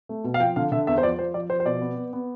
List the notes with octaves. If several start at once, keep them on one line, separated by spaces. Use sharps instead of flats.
A3
B2
F5
F3 G5
D3 F5
D3 E5
E2 E5
C5
F3 D5
F3 C5
F3 D5
F3 C5
C5
B2 D5
B3
B3
B3